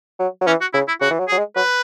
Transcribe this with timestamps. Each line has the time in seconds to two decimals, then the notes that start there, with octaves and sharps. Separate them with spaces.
0.20 F#3
0.42 F#3
0.47 E3 C#4
0.61 F#4
0.74 C#3 E4
0.88 E4
1.01 C#3 F#4
1.11 E3
1.19 F#3
1.28 G#4
1.32 F#3
1.38 G#3
1.56 F#3 B4